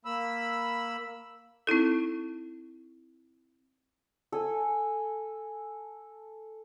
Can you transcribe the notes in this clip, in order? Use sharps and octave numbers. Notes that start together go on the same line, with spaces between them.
A#3 B5 E6
C4 D#4 E4 A4
A4 G#5